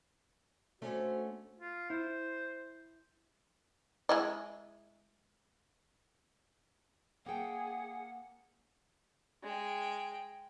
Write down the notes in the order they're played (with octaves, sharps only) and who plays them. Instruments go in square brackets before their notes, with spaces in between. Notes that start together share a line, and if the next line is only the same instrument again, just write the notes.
[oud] A3 C#4 D4 [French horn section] F#4 C5
[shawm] F4
[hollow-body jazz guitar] E4 [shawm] C5
[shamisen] G#3 E4 D#5
[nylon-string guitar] A#3 G5 [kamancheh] G#4 [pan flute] F#5
[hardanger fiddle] G#3 G5